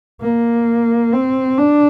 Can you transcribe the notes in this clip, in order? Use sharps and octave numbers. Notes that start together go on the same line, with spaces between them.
A#3
C4
D4